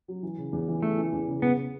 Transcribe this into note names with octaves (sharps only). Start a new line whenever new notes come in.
F#3
E3
C#3
E2
E3
E3 A3
E3
E2
C#3
C#3 B3
C#3